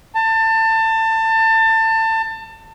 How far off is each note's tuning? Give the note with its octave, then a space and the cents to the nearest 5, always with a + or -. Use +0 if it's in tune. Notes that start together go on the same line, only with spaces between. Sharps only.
A5 +25